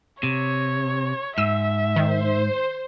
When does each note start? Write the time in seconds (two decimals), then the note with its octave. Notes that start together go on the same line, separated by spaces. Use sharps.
0.23 C3 C#5
1.38 G#2 E5 E6
1.96 D#3 C5